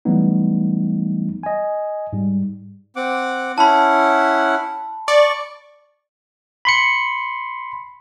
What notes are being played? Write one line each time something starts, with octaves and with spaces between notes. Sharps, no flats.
E3 F#3 G3 A3 B3 D#4
D#5 G#5
G#2 G3
C4 F#5 D6
C#4 E4 F#5 A5 B5
D5 C#6
B5 C6 C#7